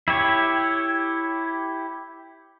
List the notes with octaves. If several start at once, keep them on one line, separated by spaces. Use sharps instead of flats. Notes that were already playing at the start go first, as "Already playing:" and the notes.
E4 G4 C#5